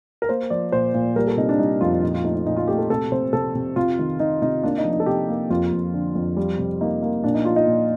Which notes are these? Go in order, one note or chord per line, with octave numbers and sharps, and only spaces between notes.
A#4
A#3 C5
F3 D5
A#2 C5
A#2
G3 A#4
A4
C3 D#4
D4
G3 D#4
F2 F4
A#2 D#4
F4
A3 D#4
D#4
A#2 D#4
F4
A3 G4
A4
C3 A4
C3 C5
C3 A4
C3
C3 F4
D#3
D#3 D#4
C3 D#4
A#3 D4
D#4
F3
D#4
A4
C3 G4
A#3
F2 F4
F2
D3
F2
G3
C3
A#3 D#4
A#3
A#2 D4
D#4
F3 F4
D#4
A#2